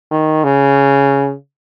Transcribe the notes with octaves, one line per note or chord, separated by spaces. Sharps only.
D#3
C#3